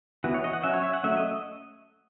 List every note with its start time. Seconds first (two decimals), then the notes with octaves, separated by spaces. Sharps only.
0.24 E3 B3 F#4
0.34 C#5
0.44 D#5
0.53 F#5
0.63 F#3 C#4 E5
0.73 C#5
0.83 E5
0.93 F#5
1.04 F#3 A3 C#4 E5
1.17 D#5